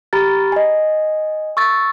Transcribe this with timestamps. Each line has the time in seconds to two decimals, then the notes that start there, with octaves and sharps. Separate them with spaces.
0.13 G4 A#5 B5 F6 A6
0.52 D#5 G#5
1.57 C#6 E6 A6